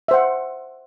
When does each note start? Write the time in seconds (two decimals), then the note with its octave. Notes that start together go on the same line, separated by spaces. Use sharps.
0.08 E5
0.11 C5
0.14 F#5